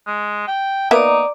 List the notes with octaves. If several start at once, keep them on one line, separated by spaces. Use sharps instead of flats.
G#3
G5
A#3 B3 D#4 D5 E5 A#5 D6